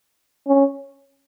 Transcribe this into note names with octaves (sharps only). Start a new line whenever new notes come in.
C#4